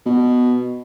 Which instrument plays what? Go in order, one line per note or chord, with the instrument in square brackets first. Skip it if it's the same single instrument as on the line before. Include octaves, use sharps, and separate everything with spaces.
[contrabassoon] B2